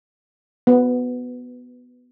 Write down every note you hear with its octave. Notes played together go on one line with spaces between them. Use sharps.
B3